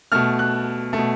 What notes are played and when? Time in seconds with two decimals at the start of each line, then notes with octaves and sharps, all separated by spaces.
0.12 B2 A3 F6
0.39 F#6
0.93 A3
0.98 B2